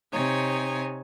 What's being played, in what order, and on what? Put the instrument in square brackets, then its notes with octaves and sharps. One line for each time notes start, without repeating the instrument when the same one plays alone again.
[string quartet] C3 D#4 C#5 G#5